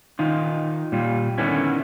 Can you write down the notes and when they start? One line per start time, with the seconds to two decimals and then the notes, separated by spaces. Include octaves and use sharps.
0.19 D#3 D#4 F4
0.92 A#2 G3 F4
1.38 D3 D#3 B3 C#4 E4